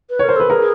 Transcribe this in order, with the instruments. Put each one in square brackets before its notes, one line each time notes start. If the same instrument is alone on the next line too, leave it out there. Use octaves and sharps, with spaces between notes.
[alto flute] B4
[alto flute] A#4 [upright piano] C#5
[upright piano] C5
[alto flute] A4 [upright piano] B4
[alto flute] G#4 [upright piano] A#4